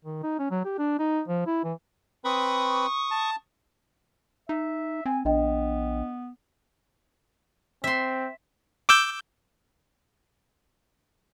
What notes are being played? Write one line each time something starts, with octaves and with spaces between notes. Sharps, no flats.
D#3
D#4
C#4
F#3
G4
D4
D#4
F3
E4
E3
C4 B4 B5 C#6 D#6
A5
D#4 E5
C4 G#5
A#1 B3 D4 D#5 G5
C4 E5 C6
D6 E6 G6